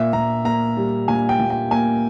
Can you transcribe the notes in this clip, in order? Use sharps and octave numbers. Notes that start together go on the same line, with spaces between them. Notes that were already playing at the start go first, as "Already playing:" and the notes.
Already playing: A#2 E5
A#2 A#5
A#3 A#5
G3
A#2 G#5
G5
A#2
G5
A#3 G#5